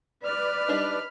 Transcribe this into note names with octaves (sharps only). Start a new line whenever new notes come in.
B4 D5 B5 F6
G3 D4 D#4